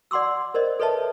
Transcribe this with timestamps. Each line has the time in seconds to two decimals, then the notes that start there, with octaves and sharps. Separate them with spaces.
0.11 D5 F#5 C6 D6 E6
0.54 A#4 C5 D5 D#5
0.80 A4 B4 C#5 D#5 E5 A5